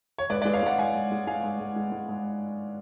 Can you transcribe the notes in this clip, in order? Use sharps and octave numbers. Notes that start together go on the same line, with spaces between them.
C#5
G#2 B4 D5
C#5
B4 D5
G#3
C#5 F5
G#3 D5 F#5
G#2 F5 G#5
G#2
G#3
G#3 F5 G#5
G#2
G#2
G#3
G#3
G#2